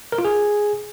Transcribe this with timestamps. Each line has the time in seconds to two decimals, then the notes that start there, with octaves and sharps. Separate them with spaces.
0.12 A#4
0.18 F4
0.25 G#4